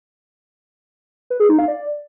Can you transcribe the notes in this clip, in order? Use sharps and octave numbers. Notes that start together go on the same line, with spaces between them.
B4
G#4
D#4
F5
D5